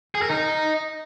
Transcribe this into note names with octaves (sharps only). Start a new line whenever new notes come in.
G#4
A#4
D#4